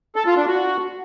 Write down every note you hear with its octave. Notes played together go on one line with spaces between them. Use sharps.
A4
F4
D4
F#4